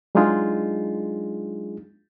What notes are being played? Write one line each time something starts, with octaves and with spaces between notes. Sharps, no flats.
F#3 G#3 D4 D#4 F4 G#4